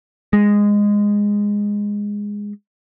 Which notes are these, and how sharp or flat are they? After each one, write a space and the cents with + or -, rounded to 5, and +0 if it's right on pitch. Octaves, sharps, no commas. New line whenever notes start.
G#3 -10